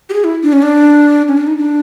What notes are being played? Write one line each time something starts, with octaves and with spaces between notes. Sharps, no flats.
G4
G#4
E4
D4
C#4
D4
C#4
D4
D#4
D4